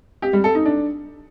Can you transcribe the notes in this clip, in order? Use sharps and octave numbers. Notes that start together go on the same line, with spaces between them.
G4
G3
A4
D#4
D4